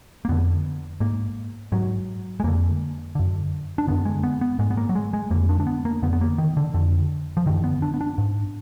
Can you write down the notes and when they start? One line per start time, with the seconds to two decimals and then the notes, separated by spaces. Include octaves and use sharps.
0.25 A#3
0.29 F2 D3 B3
1.00 G#2 A#3
1.72 G#2 F#3
2.40 G#3
2.44 F2 D3 A#3
3.15 F#2 D3
3.78 D4
3.87 F#2 D3 B3
4.05 G#3
4.23 B3
4.41 B3
4.59 G#2 G#3
4.71 B3
4.77 A#3
4.89 F#3
4.95 G#3
5.13 G#3
5.31 F2 D3 A#3
5.49 D4
5.60 D4
5.67 B3
5.85 A#3
6.02 F2 D3 B3
6.13 B3
6.21 A#3
6.38 D#3
6.57 D3
6.74 F2 D3
7.37 F3
7.46 F#2 D3 D#3
7.64 B3
7.82 D4
7.94 B3
8.01 D4
8.18 G#2